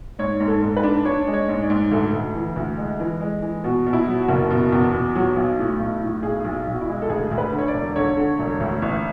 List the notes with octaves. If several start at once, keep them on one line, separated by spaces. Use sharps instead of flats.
G#2 C#5
G#2
A4
G#2
B4
D4
D4 C#5
G#3
C#5
G#2
D5
G#2
D2 A4
D2
E3
D2
G#3
E3
G#3
E3
B2 F#4
B2
E4
F#3
F#4
F#1
B2
E2
B2
F#3
B1
A2
B1
A2
B1 G#4
B1
B1 F#4
E4
G#3
A4
D2 G#4
D2
B4
D3
C#5
D5
E1
D3 C#5
D3
E1
D2
A1